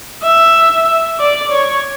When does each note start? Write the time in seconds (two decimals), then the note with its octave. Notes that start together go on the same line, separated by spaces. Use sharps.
0.23 E5
1.19 D5
1.51 C#5